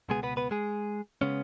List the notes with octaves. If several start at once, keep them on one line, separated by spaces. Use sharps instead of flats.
C#2 B2 G#3 B3 G#4
B3 B4
B3 B4
G#3 G#4
C#3 G#3 B3 C#4